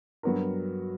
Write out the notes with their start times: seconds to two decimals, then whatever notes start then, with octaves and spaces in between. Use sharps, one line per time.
0.23 G2 F#3 B3 F#4 A#4